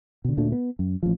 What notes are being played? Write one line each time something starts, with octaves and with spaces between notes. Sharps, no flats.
B2 D3
D2 A#2 A3 D4
B3
F#2
A1 F3